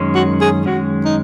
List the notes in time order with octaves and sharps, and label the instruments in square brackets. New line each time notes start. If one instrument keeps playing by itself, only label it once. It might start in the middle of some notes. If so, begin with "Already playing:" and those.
Already playing: [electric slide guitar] F#2 D#3 G#3 C#4
[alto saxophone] F#4
G#4
[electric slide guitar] F#2 D#3 G#3 C#4 [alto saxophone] F#4
[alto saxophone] D#4